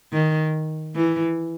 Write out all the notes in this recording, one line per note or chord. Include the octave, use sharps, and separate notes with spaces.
D#3
E3